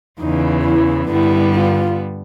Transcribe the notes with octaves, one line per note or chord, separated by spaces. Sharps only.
E2 C#3 E3 D#4
E4
G2 D3 G3 B3 E4
F4